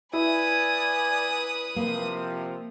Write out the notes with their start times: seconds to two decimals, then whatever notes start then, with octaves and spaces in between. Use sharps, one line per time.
0.13 E4 B4 D5 G#5 D#6
1.76 C3 F3 A#3